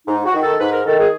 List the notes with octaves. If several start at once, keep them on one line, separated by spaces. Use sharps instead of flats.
G#2 D#4
F#4
D#3
A4
G#2 B4
A#4
D#3 A4
G#4